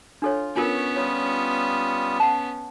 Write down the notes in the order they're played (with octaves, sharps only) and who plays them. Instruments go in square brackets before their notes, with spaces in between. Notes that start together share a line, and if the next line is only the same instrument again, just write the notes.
[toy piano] D4 A4 C#5 [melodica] F4
[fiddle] B3 C#4 [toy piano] D4 F4 A#4 [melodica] C#5
[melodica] G3 F4 D#6 [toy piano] C#5
[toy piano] F#5 A5